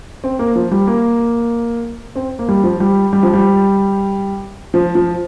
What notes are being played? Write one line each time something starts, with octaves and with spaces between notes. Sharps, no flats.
C4
A#3
F3
G3
A#3
C4
A#3
G3
F3
G3
G3
F3
G3
F3
F3